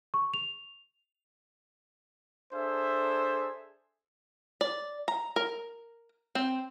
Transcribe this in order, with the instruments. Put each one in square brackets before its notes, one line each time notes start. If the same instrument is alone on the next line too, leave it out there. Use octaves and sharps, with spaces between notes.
[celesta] C#6
F7
[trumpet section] D4 G#4 A4 C5 E5
[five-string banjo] D5
A#5
A#4
C4